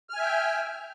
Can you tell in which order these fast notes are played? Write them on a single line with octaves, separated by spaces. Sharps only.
F6 G#5 E5 G5